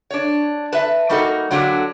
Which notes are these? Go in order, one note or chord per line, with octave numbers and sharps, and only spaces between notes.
D4 C#5
B4 E5 A5
G3 A#3 D#4 F#4 A4
D3 F#3 A#3 D4 F#4 G4